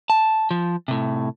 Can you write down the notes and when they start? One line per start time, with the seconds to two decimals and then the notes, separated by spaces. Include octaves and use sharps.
0.10 A5
0.51 F3
0.88 A2 C3